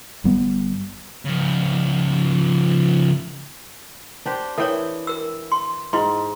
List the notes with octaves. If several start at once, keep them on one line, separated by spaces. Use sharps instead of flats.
G1 G3 B3
C#3 F3
D4 G4 C5
E3 A4 A#4 C#5 G5
A#4 E6
C6
G#2 E4 C6